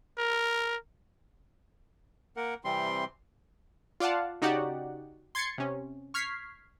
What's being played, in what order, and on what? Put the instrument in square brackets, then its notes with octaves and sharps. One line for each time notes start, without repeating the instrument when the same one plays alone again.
[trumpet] A#4
[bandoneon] A#3 A#4 F#5
C3 E3 G3 C4 C6
[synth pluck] F4 D5 F5 F#5 A5
C#3 D#4 F#4 G4 D5 F#5
C6 G#6 A6 C7 C#7
C3 C#4
C#6 F6 G#6 B6 C7